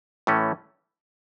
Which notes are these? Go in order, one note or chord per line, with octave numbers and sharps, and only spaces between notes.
A2 E3 A3 C#4